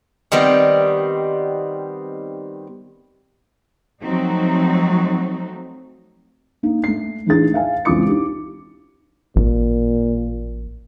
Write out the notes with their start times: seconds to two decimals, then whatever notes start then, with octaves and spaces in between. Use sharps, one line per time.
0.32 D#3 G3 B3 C4
4.03 F3 F#3 A3 C4 D#4 F#4
6.63 A#3 D#4
6.84 A3 C7
7.26 A2 E3 D4 D#4 G#4 A6
7.54 E5 F5 G#5
7.85 C#2 E3 C4 F4 D6 C#7
8.06 D#4 E4 G4
9.36 A1 A#2